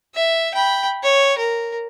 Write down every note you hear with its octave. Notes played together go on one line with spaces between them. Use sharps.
E5
G5 B5
C#5
A#4